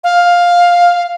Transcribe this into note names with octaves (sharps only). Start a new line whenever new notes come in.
F5